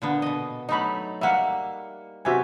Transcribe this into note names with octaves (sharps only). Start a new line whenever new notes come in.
A#2 D3 B3
B2 D#5
F#3 A3 D#4 D#5 B5
G3 A#3 E5 F#5
C3 B3 F#4 G4 E5 G#5